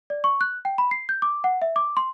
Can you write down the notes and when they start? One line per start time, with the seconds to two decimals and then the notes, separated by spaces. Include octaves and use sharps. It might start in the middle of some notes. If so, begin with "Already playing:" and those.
0.10 D5
0.24 C#6
0.41 F#6
0.65 G5
0.78 B5
0.91 C7
1.09 G6
1.22 D6
1.44 F#5
1.62 E5
1.76 D6
1.97 C6